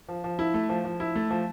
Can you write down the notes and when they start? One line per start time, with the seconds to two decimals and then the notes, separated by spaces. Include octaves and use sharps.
0.08 F3
0.24 F3
0.39 E4
0.54 A3
0.69 F3
0.85 F3
1.00 E4
1.15 A3
1.30 F3